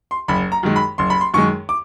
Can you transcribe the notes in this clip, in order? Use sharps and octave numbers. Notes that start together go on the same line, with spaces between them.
C6
F#1 B5
A#5
F#2 D#3 G#3
B5
F#1 C6
B5
C6
F#2 D#3 G#3 C#6
D6